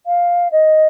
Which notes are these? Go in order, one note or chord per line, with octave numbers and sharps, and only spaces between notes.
F5
D#5